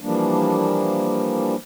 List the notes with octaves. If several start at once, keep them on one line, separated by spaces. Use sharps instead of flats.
E3 F3 G3 A#3 D4